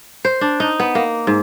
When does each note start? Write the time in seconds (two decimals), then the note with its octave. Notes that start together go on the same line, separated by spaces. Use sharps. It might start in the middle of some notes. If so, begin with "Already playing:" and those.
0.25 C5
0.41 D4
0.60 D#4
0.80 B3
0.95 A#3
1.27 G#2